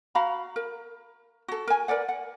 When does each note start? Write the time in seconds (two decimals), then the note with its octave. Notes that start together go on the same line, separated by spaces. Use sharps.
0.15 F#4 F5 A#5 B5
0.56 A#4
1.48 F#4 A4
1.67 A#4 G#5
1.88 A#4 B4 D5 F#5
2.08 F#5